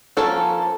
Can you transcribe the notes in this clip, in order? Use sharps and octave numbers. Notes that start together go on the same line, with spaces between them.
F3 A#3 C#4 A4